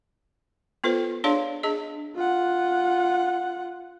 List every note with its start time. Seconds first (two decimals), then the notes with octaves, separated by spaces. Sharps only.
0.84 B3 F4 A4 B4 C5
1.24 D4 G#4 C#5 D5 F5 C6
1.63 D4 G#4 D#5
2.15 F4 F#5